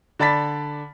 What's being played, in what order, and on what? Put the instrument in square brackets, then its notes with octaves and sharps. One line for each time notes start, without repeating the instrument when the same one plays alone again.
[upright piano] D3 D5 A5 B5 A6 B6